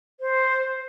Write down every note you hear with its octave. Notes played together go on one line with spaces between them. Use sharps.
C5